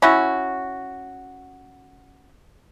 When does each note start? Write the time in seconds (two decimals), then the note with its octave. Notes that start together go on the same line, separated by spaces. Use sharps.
0.02 C#4 E4 F#4